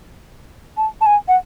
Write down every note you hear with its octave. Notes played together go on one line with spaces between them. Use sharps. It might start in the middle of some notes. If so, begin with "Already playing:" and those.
A5
A5
G#5
F#5